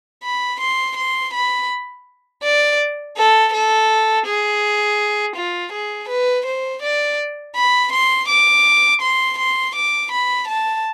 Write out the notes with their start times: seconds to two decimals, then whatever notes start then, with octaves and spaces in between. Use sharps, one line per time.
0.23 B5
0.60 C6
0.97 C6
1.34 B5
2.43 D5
3.17 A4
3.53 A4
4.26 G#4
5.36 F4
5.72 G#4
6.09 B4
6.46 C5
6.82 D5
7.56 B5
7.92 C6
8.28 D6
9.01 C6
9.38 C6
9.75 D6
10.12 B5
10.48 A5